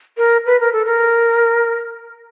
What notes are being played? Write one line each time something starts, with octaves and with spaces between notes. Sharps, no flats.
A#4
B4
A#4
A4
A#4